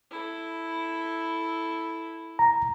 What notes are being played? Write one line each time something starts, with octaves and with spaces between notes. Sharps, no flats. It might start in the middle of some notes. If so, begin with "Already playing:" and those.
E4 A4
A#5